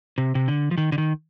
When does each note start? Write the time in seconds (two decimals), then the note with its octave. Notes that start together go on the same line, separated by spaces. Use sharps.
0.18 C3
0.35 C3
0.48 D3
0.71 F3
0.78 D#3
0.92 D3
0.98 D#3